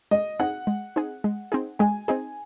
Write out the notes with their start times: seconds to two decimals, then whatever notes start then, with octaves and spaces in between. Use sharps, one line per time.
0.11 G#3 D#5
0.40 C4 D#4 G#4 F#5
0.67 G#3
0.96 C4 D#4 G#4
1.24 G#3
1.52 C4 D#4 G#4
1.79 G#3 G#5
2.08 C4 D#4 G#4